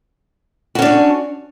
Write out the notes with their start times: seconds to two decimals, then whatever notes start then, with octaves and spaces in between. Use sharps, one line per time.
0.75 F#4
0.79 C#4
0.82 D4
0.85 C#5